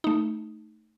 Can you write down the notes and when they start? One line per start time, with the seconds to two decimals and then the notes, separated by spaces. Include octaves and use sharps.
0.04 A3 D#4